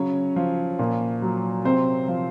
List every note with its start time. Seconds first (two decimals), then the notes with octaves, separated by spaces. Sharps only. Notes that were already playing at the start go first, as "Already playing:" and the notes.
Already playing: C#3 F#3 C#4 C#5
0.36 F3
0.79 A#2
1.22 F#3
1.64 C3 C4 C5
2.08 F3